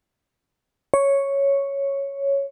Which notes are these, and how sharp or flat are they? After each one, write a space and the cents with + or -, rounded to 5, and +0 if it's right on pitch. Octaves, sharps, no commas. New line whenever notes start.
C#5 +0